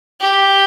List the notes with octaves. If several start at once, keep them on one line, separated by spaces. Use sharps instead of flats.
G4